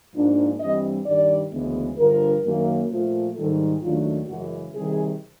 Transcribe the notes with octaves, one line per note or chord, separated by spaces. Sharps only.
G#2 F3 A#3 D4
G2 E3 G3 C4 D#5
G2 D#3 G3 D5
D2 C#3 E3 G#3 B3
G2 D3 F3 A#4
F#2 D#3 F#3 A#3
A#2 F3 A3
G#2 D#3 G3 A4
D#2 D#3 F#3 A3 D4 F4
F#2 C#3 E3 G#3 F#4
C3 D#3 G3 G#4